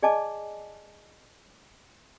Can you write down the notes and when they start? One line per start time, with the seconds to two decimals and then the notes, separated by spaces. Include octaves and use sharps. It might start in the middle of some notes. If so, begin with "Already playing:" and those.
0.03 G#4 D5 D#5 G#5 A5 D6